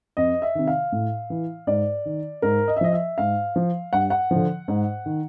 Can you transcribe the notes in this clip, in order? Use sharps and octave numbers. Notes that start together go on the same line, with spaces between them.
F2 D#5
E5
C3 D#3
F5
A2
E3
G#2 D5
D#3
G#2 A#4
D#5
E5
F3 D#5
E5
G#2 F5
F3
G2 F#5
F#5
D3 F3
G#2
D#3